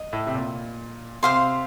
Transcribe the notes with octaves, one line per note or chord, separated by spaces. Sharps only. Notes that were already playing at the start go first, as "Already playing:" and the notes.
Already playing: D#5
A2
C3
A#2
C3 C5 F5 C6